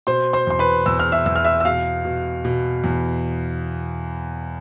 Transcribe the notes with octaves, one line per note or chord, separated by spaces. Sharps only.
B2 C5 C6
C5 C6
E2 C6
B4 B5
E2 E6
F6
E5 E6
E2 E6
F6
E5 E6
E6
B2 F5 F6
B2
B2
E2